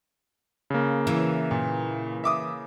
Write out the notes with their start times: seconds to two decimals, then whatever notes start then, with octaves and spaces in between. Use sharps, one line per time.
0.70 C#3 A#3
1.07 E3
1.51 A#2
2.24 E5 D6 D#6